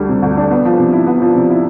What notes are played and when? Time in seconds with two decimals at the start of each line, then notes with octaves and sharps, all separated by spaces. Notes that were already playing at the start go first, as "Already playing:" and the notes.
Already playing: D2 G3 D4
0.09 C3
0.22 D2
0.37 D4
0.51 B3
0.65 F3
0.79 C3
0.93 E4
1.07 B3
1.22 F3
1.36 C3
1.50 E4